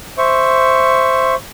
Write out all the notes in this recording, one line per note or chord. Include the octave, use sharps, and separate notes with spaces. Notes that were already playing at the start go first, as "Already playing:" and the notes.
C5 E5 C#6